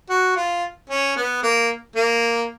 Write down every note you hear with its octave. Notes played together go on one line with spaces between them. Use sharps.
F#4
F4
C#4
B3
A#3
A#3